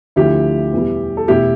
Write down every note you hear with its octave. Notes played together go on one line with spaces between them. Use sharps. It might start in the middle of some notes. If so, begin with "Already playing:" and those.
D2 D3 F3 A3 E4 G4
E2 B2 G3
A4
E1 E2 B2 A3 E4 G4